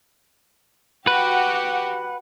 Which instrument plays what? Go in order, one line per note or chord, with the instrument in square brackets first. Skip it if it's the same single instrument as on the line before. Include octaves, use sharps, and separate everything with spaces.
[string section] F#4 G4 [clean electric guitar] B4 [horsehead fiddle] F#5